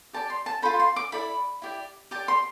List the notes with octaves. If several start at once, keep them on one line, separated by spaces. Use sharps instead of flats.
G4 D5 A5
C6
A5
F4 A4 C5 B5
C6
D6
E4 A4 D5 B5
E4 G4 D5
G4 D5 A5
C6